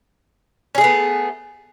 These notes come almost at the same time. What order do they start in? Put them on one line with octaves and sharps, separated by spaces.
C#4 G#4 A3 B3